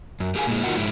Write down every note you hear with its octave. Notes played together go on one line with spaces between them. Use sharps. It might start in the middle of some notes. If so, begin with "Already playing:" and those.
F#2
A3 G4 G#4 A#4 F5 G#5
A#2 G#3
D#3 D#4 F4 F#4 A#4 F#5
F2 G#2 G#3 E4